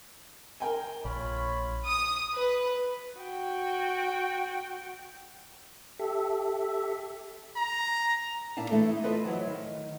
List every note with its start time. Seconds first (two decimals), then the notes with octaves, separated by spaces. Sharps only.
0.60 A#4 G5 G#5
1.05 A#1 F4 C#5 B5
1.86 D#6
2.35 B4
3.19 F#4 G5
5.99 G4 A4 E5
7.56 A#5
8.57 A#2 D4 E4 F5 A5
8.70 E3 A3 A4
8.89 D#4
9.03 F4 A4 B4 C5 D#5 E5
9.25 E3 F#3
9.47 D#3